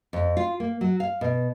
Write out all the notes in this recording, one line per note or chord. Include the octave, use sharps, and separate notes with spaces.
F2
F4
A#3
F#3
F5
B2